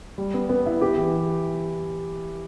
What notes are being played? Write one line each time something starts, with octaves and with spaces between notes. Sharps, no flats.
G3
B3
B3
E4
G4
E3